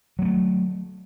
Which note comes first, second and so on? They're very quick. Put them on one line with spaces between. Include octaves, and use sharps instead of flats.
F#3 A#3 A3